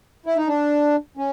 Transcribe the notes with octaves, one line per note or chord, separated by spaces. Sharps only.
E4
D#4
D4
C#4